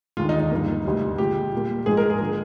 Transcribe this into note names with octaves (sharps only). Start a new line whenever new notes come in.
D#2 D3 G#3 F4
D#4
D#4
G2 F3 A#3
D2 C3 G3
A#2 F3 G#3 G4
A#2 G3 A#3
G#2 F3 G#3 G#4
A#4
G#4
D3 F3